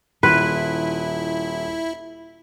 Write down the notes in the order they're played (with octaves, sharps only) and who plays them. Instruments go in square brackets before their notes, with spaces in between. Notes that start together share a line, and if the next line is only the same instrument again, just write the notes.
[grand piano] D#1 C6 [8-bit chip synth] E4 [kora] B4